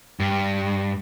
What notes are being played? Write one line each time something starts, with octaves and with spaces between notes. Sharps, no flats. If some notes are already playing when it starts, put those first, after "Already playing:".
G2